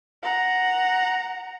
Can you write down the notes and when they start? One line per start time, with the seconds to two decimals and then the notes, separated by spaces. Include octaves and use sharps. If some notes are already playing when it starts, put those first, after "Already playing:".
0.23 F#5 A#5